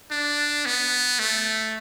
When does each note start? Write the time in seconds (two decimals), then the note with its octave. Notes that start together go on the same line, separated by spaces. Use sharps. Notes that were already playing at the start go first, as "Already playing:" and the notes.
0.11 D4
0.65 B3
1.19 A3